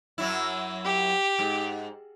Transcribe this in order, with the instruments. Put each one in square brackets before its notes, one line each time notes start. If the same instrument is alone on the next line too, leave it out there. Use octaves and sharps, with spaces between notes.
[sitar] F#2 F#3 E4
[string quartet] G4
[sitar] G#2